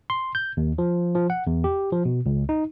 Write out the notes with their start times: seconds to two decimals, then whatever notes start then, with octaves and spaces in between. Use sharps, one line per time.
0.10 C6
0.35 G6
0.57 D#2
0.78 F3
1.15 F3
1.30 F#5
1.47 E2
1.64 G4
1.92 F3
2.05 B2
2.26 C#2
2.49 D#4